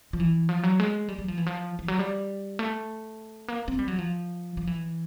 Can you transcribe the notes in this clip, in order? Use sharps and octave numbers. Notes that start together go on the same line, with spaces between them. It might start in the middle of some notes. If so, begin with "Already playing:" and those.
F3
E3
F3
F#3
G#3
G3
F#3
F3
E3
F3
E3
F#3
G3
A3
A#3
C4
G3
F#3
F3
F3
E3